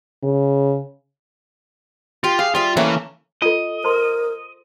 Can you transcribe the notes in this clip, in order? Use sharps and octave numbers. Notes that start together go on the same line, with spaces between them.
C#3
F4 G4 G5
G#4 F5
G3 F4 E5
E3 A3 A#3 C#4
F4 A4 D#5
A#4 C5 A#5 C6